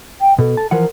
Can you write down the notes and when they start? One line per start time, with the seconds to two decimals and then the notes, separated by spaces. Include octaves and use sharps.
0.21 G5
0.39 B2 A4
0.57 A5
0.71 E3 F3 A#4 F#5